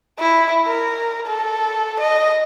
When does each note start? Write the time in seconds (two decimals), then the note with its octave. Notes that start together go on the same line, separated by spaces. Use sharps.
0.19 E4
0.68 A#4
1.27 A4
2.00 D#5